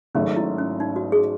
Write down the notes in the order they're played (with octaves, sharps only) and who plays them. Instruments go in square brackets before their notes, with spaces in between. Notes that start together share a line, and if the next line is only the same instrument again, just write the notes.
[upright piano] G#1 G#2 F#3 A3 [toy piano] C#4
[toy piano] E4
C#4
D#4
F#4
G#4